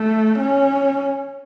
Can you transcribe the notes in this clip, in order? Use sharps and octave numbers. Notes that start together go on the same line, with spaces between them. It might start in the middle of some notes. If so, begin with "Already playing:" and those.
Already playing: A3
C#4